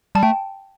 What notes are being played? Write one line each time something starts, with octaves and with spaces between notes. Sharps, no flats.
G3 A5
A3 G5